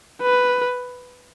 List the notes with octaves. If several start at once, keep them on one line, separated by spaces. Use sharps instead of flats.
B4